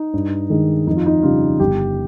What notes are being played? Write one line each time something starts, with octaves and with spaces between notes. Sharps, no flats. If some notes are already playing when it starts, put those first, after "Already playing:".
Already playing: D#4
G2
D#3 G#3
F2 D#4
F4
D#4
C#3 G3 F4
G1 G4